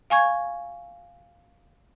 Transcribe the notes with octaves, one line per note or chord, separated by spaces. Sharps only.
F5 G#5 C#6 G#6